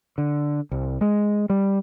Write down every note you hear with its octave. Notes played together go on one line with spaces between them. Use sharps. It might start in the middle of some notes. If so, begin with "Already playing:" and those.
D3
C2
G#3
G3